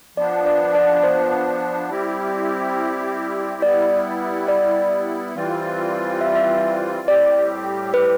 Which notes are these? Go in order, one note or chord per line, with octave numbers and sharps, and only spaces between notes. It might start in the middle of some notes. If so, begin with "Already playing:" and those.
F3 B3 D4 D5
D5
D5
C5
G3 C4 E4 G4
G3 B3 E4 D5
D5
E3 G3 C4 F4
E5
E5
A2 G3 C4 G4 D5
B4